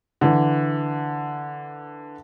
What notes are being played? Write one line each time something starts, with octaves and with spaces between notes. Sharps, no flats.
D3 E3